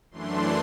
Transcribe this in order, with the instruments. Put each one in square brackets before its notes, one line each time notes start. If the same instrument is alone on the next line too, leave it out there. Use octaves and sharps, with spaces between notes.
[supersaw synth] F#2 E3 A3 D4 C6